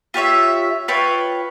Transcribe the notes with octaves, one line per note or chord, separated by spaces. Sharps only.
F4 G4 C#5 E5
F4 B4 C#5 G5